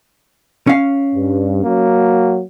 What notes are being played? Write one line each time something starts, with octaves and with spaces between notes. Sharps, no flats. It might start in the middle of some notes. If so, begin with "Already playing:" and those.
C#4 F5
G2
F#3 A#3 F#4